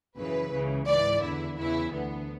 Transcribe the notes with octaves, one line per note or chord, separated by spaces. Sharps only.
F#2 C#3 E3 B4
C#2 C#3 E3
G#2 E3 D5
E2 D3 E4
E2 C#3 E3 E4
D2 D3 B3